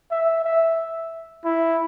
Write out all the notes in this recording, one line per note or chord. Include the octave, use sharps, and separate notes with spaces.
E5
E5
E4